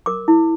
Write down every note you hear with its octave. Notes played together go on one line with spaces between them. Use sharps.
A#4 D6
E4